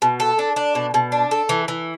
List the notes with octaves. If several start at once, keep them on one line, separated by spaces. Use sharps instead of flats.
B2
A4
D4
D4
B2
B2
D4
A4
E3
E3